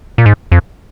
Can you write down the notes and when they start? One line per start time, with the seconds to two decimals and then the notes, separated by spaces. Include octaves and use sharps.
0.18 A#2
0.26 G#2
0.52 F2